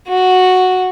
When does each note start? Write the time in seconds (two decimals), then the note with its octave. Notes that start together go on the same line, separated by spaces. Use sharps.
0.08 F#4